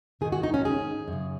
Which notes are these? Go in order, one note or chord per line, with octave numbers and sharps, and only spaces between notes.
G#2 D#3 G#4
F#4
D#4
C#4
G#4
F#2 C#3